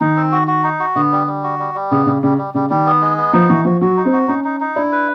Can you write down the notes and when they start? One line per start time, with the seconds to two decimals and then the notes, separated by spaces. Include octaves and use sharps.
0.01 D#3 D#4
0.16 C4
0.32 F#4
0.48 F#4
0.64 D#4
0.80 F#4
0.95 D3 B3
1.12 G3
1.27 G3
1.43 F#4
1.59 G3
1.75 G3
1.91 C#3 B3
2.06 C#3 G3
2.22 C#3 G3
2.38 G3
2.54 C#3 G3
2.70 D#3 G3
2.86 B3
3.01 G#3
3.17 B3
3.33 F3 D#4
3.49 E3 F#4
3.65 F3 F#4
3.81 F#3 F#4
3.97 D#4
4.05 C4
4.13 F#4
4.28 C#4 D#4
4.44 D#4
4.60 D#4
4.75 D4 E4
4.92 B4